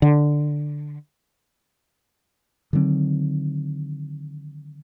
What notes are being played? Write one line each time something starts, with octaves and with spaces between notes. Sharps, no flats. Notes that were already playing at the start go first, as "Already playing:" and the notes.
D3
D3 D#3 F#3 C4